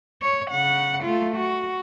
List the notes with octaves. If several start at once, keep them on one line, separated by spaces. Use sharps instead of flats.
C#5
C#3 F#5
A3 F4
F#4